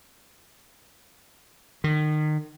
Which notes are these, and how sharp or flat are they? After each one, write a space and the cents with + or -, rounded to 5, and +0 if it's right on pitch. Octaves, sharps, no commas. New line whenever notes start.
D#3 -30